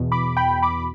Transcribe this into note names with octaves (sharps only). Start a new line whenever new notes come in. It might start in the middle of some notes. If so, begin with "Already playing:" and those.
Already playing: E2 B2
B5 D6
G5 B5
B5 D6